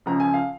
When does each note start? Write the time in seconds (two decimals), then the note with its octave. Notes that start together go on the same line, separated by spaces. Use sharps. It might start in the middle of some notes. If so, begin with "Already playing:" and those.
0.06 C#2 C#3 F3 A#5
0.20 G#5
0.34 F5